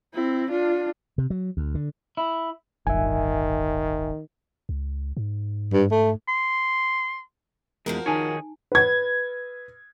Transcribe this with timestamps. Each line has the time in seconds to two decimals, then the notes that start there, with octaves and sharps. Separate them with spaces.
0.14 C4 E4
0.51 D4 F4
1.18 C3
1.30 F#3
1.57 D2
1.75 D3
2.17 E4
2.87 D1 G1 D#3 E5 G#5
4.69 C#2
5.17 G#2
5.73 G2
5.91 A3
6.28 C6
7.86 E2 F3 G#3 F#4 A#4
8.06 D#3 D#4 G#4 C#5 G#5 A5
8.72 B4 G#6